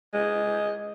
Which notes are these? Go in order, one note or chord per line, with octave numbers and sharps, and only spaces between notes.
G#3